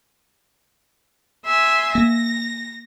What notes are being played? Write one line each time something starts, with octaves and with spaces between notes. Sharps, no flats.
E5 G#5 C6
A#3 A#6